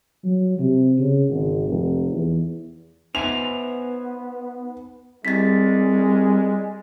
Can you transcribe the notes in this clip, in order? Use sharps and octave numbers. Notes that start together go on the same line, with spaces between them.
F#3
C3
C#3
G#1
F1
E2
B3 D#4 C5 E5 G#5 F7
C2 G3 G#3 A6 B6